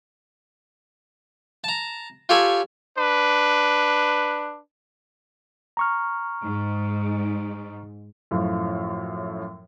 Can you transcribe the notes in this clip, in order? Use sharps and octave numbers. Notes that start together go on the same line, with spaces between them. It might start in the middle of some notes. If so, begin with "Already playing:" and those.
A5 A#5
F4 G4 A4 C#5 G#5 B5
D4 B4
A#5 C#6 F6
G#2
F#2 A2 F3